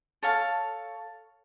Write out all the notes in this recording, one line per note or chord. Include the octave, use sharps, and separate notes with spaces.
A4 C#5 F5 A5